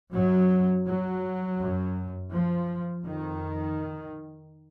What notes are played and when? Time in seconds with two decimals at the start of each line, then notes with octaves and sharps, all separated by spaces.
0.14 F#2 F#3
0.86 F#3
1.60 F#2
2.31 F3
3.04 F2 D#3